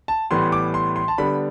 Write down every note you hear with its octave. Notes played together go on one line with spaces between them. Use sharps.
A5
A2 E3 G3 B3 C6
D6
C6
C6
A5
D3 G3 B3 B5